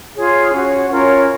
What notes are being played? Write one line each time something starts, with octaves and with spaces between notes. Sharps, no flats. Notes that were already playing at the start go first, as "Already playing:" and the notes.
F4 G#4 C#5
C#4 F#4 C#5
C#4 F4 A#4 C#5